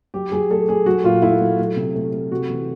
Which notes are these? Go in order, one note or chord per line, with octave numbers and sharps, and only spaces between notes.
F#3 G4
F#3 G#4
A3 A4
A3 G#4
F#3 F#4
A#2 F4
A3 E4
F#3
A3
C3
A3
A3
C3 F#4
E3